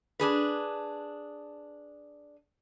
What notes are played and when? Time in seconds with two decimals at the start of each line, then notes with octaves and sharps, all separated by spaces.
0.20 D4 G#4 B4